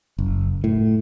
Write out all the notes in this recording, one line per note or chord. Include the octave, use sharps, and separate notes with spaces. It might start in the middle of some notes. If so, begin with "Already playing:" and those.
F#1
A2